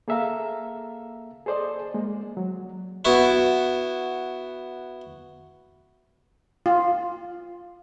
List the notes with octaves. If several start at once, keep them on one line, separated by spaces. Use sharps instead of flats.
A#3 G#4 A4 E5 F5 A#5
G#4 A4 C5 D5 D#5
G#3 A#3
F#3
B3 E4 F#4
F4